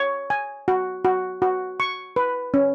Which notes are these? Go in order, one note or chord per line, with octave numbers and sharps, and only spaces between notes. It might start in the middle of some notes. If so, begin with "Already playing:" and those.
Already playing: C#5
G#5
F#4
F#4
F#4
C#6
B4
C#4